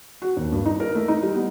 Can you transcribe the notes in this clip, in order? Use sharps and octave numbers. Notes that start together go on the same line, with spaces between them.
F#4
D#2
G2
D#4
A#4
A3
D#4
G3
B3